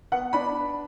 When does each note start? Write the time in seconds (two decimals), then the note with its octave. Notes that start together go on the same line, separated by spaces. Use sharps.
0.12 B3 F#5
0.33 D4 B5